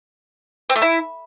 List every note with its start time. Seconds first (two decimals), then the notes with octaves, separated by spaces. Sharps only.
0.70 C4
0.76 A3
0.82 E4